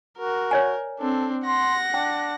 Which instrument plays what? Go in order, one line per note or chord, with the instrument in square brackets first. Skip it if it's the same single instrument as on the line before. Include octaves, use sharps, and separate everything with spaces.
[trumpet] F#4 [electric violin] A#4
[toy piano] C#5 D5 G#5
[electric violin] C4 D4 [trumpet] A4
[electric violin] F#5 A#6 [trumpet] C6
[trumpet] D4 [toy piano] G5